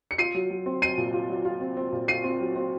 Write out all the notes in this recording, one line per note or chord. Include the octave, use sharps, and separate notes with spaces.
C#7
F4 C7 D#7
F#3
F#3
C4
F#3 C7 D#7
A#2
F4
F#3
F4
C4
C4
A#2
F4 C7 D#7
C4
F#3
C4